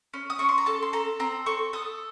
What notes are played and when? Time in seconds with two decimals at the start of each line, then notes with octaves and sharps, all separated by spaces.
0.14 C#4
0.30 D#6
0.39 C#4 C#6
0.49 C6
0.58 A#5
0.66 A4 A5
0.82 C6
0.93 A4 A#5
1.20 C4 A#5
1.46 A4 C#6
1.73 A4 D#6